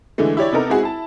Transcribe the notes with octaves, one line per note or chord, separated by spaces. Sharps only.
D3 E3 G#3 A3
E4 G4 C#5 D5
C3 B3 D#4 A4 A#4
G#3 C4 E4 F#4 G#4
E4 A5